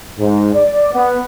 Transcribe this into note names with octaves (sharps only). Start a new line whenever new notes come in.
G#2
D5
B3